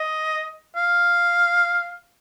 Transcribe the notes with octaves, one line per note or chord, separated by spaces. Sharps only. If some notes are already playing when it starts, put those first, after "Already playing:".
Already playing: D#5
F5